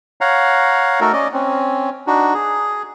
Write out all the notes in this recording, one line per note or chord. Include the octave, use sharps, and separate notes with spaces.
C#5 F5 F#5 A#5
A3 D#4 F#4 A4 A#4
C#4 D5 D#5
C4 C#4
D4 D#4 F#4
G#4